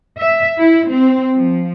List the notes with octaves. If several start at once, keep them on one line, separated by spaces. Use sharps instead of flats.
E5
E4
C4
F3